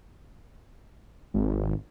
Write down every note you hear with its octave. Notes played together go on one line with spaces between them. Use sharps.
G#1